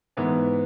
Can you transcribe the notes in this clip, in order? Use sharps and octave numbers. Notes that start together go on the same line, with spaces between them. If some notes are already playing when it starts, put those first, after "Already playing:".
G#2 E3 B3